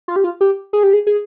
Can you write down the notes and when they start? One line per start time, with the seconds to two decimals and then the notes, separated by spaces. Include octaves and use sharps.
0.08 F4
0.16 G4
0.24 F4
0.41 G4
0.73 G#4
0.83 G4
0.93 G#4
1.07 G#4